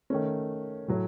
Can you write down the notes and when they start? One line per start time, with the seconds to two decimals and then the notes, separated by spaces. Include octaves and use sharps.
0.10 D#3 A3 C#4
0.88 A2 F#3 A3